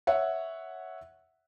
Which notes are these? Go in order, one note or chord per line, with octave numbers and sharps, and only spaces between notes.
C#5 E5 F#5